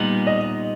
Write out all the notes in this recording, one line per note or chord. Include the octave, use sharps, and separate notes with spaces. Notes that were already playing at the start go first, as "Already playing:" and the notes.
Already playing: A#2 G3 B3 D#4
D#5